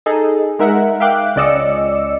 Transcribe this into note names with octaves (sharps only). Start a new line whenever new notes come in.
D#4 G#4 A4
G#3 D#4 A#4 E5 F#5
E5 F5 G5 D6 F#6
C#2 C#4 D5 D#5 E6 C#7